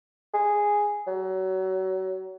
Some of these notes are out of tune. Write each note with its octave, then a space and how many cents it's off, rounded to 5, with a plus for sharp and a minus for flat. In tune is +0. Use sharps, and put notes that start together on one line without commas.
G#4 -5
F#3 +30